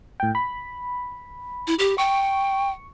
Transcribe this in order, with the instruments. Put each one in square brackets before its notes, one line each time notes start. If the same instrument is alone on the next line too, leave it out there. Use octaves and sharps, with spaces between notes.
[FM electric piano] A2 G5
B5
[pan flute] E4
G4
[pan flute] G5 [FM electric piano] C#6